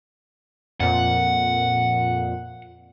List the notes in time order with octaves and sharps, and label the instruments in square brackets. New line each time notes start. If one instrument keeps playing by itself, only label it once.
[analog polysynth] F2 A#2 [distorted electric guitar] F#5